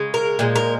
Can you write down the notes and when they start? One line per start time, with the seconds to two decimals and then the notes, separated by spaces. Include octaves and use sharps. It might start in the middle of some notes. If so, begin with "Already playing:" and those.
Already playing: C#3 G#3
0.14 A#4
0.39 A#2 F3 G#3
0.56 A#4